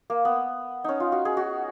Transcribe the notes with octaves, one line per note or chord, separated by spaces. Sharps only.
A#3
B3
C#4 D#4
F4
F#4
G#4
F#4